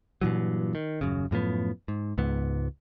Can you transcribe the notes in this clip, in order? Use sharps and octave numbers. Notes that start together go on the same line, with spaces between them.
G2 A#2 E3 F#3
D#3
D#1 F#2 C#3
F#2 A2 F3 B3
G#2
C#2 G#2 B3